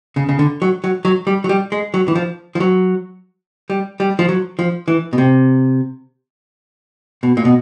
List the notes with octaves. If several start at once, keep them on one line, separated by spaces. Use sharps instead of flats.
C#3
C#3
D3
F#3
F#3
F#3
G3
F#3
G3
G#3
F#3
E3
F3
F3
F#3
G3
G3
F3
F#3
F3
E3
B2
C3
B2
A#2
B2